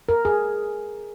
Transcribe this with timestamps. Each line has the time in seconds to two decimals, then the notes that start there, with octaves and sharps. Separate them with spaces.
0.09 A#4
0.25 G#4